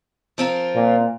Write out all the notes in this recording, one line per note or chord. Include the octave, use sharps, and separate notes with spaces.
F3 C4 F4 A#4
A#2